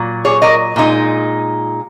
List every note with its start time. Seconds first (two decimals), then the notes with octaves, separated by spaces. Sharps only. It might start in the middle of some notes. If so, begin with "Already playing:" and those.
Already playing: A#2 F#3
0.25 G#4 C#5
0.42 A#4 D#5
0.76 A#2 G#3 D#4